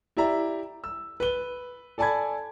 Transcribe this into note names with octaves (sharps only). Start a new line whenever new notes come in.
E4 G4 D5 E5 A#5
E6
B4 G7
A4 D5 G#5 A5 B5 G#6